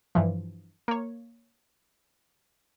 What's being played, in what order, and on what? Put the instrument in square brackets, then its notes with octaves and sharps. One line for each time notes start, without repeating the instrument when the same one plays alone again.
[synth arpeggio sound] G2 E3 F3
A#3 C#5